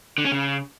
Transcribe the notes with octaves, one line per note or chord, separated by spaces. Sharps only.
D3
C#4
C#3